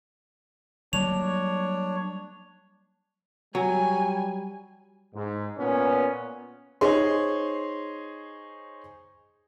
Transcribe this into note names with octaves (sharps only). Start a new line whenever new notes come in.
F#3 G3 A#3 D4 C#5 F7
F#3 G3 G#5
G#2
A#2 B3 C#4
D#4 G#4 C5 C#5 C6